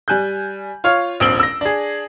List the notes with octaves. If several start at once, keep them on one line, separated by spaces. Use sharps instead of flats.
G3 G#5 F#6 G6
F4 C#5 F5
D#1 A#1 C4 D7 F#7 G7
E6 A#6
D4 G#4